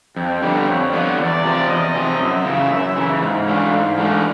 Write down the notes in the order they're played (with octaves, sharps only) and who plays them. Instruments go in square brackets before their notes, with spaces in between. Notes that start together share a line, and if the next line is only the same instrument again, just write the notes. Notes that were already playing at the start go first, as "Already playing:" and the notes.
[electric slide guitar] F2 [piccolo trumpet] G5
[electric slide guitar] D3 G3 B3
[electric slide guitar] F2 [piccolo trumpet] C#5
[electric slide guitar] D3 G3 B3
[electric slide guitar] E2 [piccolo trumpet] D5
[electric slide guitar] C3 F3
[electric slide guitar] E2 [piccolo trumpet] D#5
[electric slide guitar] C3 F3
[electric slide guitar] F#2 [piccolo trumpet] E5
[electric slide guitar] C#3 E3
F#2
C#3 E3
[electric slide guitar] G#2 [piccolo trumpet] F5
[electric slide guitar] E3 A3 D4
G#2
E3 A3 D4